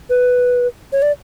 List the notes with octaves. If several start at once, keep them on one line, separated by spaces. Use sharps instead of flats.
B4
C#5
D5